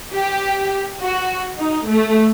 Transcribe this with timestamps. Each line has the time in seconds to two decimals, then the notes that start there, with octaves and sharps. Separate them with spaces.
0.13 G4
1.00 F#4
1.59 D#4
1.88 A3